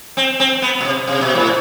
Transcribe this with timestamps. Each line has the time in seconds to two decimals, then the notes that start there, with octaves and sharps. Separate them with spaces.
0.17 C4
0.40 C4
0.62 B3
0.81 B2
0.85 C3
1.08 C3
1.21 B2
1.35 A2